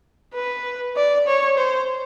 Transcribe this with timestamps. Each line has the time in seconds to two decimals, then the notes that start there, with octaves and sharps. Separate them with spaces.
0.34 B4
0.96 D5
1.27 C#5
1.57 C5